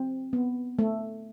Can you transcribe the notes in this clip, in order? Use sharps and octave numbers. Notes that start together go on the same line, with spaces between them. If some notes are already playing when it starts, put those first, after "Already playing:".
Already playing: C4
B3
A3